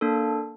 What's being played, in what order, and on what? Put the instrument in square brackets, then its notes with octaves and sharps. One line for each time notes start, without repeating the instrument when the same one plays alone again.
[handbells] A#3 D4 A4